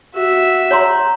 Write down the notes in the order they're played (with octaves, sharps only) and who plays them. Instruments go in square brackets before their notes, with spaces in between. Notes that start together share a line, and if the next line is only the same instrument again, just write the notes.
[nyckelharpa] F#4 E5
[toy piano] C#5 A#5 C6